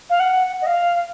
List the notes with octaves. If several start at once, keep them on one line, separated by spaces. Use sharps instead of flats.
F5
F#5
D#5
F5